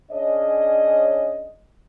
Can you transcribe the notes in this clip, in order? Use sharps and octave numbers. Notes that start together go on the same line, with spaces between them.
C#4 D4 G#4 C#5 D#5